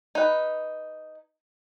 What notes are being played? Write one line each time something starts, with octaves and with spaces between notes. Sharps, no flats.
D#4 B4